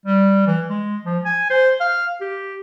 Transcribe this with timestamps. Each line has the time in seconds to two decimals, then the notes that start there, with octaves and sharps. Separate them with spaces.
0.06 G3
0.47 E3
0.70 G#3
1.06 F3
1.25 G#5
1.50 C5
1.81 F5
2.21 G4